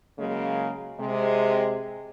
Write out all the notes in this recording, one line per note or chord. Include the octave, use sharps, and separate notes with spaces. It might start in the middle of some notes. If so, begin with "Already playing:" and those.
C#3 F#3 G#3 A#3
C3 G#3